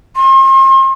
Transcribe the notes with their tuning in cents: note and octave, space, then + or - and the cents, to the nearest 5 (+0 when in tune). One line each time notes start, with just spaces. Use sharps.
C6 +40